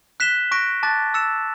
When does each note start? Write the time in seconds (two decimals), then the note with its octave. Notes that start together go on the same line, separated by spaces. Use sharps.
0.20 F#6 B6 E7 G7
0.51 C#6 F#6 A#6 D7
0.83 A5 D6 F#6 A6
1.14 E6 A6 C#7 E7